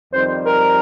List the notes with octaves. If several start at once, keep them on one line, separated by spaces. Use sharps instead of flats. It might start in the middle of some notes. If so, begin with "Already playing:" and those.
F2 D#3 G3 C4 C5
A#4